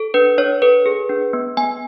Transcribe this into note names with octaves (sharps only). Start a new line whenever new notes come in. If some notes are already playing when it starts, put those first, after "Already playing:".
Already playing: A4
D4 B4
D4 C#5
A4 B4
G#4
D4
B3
B3 G#5